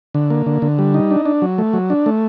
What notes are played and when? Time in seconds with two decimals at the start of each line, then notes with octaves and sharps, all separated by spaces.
0.15 D3
0.30 A#3
0.46 D3
0.62 D3
0.79 G3
0.94 D#4
1.11 D4
1.25 D4
1.42 F#3
1.58 A3
1.73 F#3
1.90 D4
2.06 A3